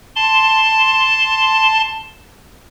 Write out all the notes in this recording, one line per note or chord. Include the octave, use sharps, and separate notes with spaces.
A5 C6